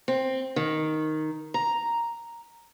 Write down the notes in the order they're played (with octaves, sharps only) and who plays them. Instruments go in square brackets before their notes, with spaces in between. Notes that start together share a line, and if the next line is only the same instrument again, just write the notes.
[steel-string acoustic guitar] C4
D#3
A#5